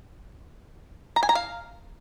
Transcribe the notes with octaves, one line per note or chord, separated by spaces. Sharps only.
A#5
G#5
A#5
F5